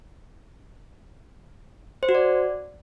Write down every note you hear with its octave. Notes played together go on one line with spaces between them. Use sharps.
C5
F#4
D5